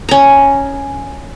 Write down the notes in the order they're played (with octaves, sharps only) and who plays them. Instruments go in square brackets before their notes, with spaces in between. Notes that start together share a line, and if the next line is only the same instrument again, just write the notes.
[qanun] C#4 A#5